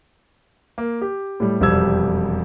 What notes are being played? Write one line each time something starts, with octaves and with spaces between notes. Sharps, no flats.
A#3
G4
A2 G3
E1 F2 C3 G3 E6 G#6